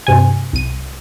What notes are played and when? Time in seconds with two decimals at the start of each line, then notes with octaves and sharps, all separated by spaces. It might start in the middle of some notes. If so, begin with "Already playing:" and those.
0.07 G2 C3 G#5
0.53 C2 D#7